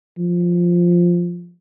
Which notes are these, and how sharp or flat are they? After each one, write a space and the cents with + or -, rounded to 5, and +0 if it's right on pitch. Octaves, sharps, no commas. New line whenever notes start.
F3 +0